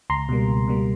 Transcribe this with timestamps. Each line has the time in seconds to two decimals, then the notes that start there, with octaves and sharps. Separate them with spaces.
0.10 C#2 A#5 C6
0.29 B2 G3 A#3
0.49 C#2
0.67 B2 G3 A#3